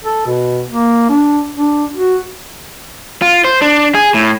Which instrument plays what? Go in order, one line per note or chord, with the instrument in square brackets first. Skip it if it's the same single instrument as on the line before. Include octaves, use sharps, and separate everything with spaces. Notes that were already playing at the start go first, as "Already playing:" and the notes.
[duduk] A4
B2
A#3
D4
D4
F#4
[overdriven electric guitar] F4
C5
D4
G#4
A2